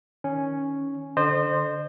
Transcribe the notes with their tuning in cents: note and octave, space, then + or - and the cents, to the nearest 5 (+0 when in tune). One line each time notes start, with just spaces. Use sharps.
D#3 +15 C#4 +0
D3 +0 C5 +0 D#5 -40